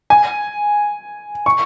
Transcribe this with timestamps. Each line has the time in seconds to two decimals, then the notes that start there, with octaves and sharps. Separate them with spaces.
0.10 G#5
1.46 C#6